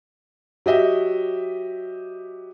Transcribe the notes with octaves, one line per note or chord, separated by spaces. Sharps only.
F#3 G4 D#5 E5